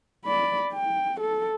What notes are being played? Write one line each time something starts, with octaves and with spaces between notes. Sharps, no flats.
D5 B5
G5
A4